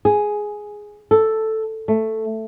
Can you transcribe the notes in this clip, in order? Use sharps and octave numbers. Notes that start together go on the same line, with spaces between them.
G#4
A4
A3